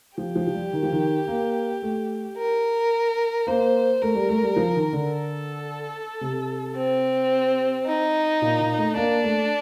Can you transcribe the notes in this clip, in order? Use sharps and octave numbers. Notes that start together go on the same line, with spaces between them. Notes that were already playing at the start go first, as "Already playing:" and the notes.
F3 G4
F3
F3
G3
D#3
F3
D#3
A#3
A3
A#4
A#3 C5
A3 A#4
G3
A3
G3
F3
D#3
D3
A4
C3
C4
D#4
A#2
A#2
A3
A#3 D4
A3